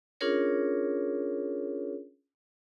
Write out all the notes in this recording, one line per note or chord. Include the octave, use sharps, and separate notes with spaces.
C#4 D4 F4 G#4 A#4 C#5